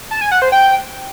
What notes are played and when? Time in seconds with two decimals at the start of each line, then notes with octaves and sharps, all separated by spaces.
0.11 A5
0.21 G#5
0.31 F#5
0.42 C5
0.52 G5